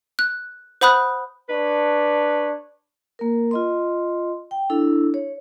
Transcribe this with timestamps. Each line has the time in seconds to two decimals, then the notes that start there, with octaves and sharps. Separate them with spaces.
0.19 F#6
0.81 C5 F#5 B5 D#6 F#6
1.49 D4 B4 C#5
3.19 A#3 A#4
3.51 F4 D#5 C6
4.51 G5
4.70 D4 E4 A4 E6
5.14 C#5